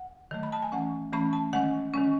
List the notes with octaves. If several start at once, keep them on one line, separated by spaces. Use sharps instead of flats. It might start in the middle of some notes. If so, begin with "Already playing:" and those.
Already playing: F#5
D#3 F#3 A3
B5
A5
G#5
E3 A3 C#4 F#5
E3 A3 C#4 B5
A5
D#3 G#3 C#4 F#5
D#3 G#3 C#4